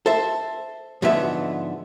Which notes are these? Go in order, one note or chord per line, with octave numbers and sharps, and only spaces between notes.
A4 C5 E5
G#2 D3 F3 B3 B4 E5